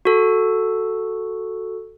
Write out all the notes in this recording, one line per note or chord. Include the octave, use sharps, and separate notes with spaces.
F#4 A4